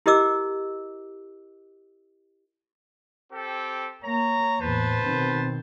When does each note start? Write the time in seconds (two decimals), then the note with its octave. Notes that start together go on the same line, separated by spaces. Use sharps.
0.06 E4 G4 A#4 D#5 D6 E6
3.31 C4 G4 A4
4.03 A#3 C#5 A#5
4.60 E2 A2 B4 C5 A5
5.01 B2 D#3 C4